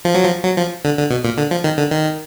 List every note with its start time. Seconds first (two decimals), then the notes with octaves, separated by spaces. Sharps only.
0.05 F3
0.15 F#3
0.25 F3
0.44 F#3
0.58 F3
0.85 D3
0.98 D3
1.11 B2
1.25 A#2
1.38 D3
1.51 F3
1.64 D#3
1.78 D3
1.91 D#3